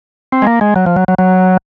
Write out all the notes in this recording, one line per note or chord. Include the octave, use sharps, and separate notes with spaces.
C4
G#3
A#3
G#3
F#3
F3
F#3
F#3
F#3